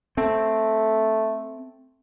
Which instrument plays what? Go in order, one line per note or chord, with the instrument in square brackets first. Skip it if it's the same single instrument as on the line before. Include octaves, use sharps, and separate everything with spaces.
[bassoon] A3 [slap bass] C4